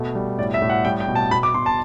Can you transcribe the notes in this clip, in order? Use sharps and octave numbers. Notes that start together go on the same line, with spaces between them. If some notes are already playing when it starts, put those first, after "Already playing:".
Already playing: B2 A3
G3
A2 D5
E5
A2
F#5
G3 G5
G5
B2
A5
B2 B5
D6
B2 C6
A5